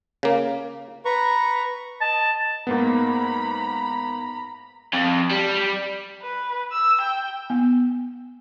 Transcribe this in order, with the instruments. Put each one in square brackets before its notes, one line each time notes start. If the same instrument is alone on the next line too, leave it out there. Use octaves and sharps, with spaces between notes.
[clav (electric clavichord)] C#3 A#3
[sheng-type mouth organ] B4 A#5 C#6
[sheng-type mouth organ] D#5 [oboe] A5
[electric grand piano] G#2 A#3 B3 [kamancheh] A#5 B5
[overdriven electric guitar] F2
G3
[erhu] B4
E6
G5
[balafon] B3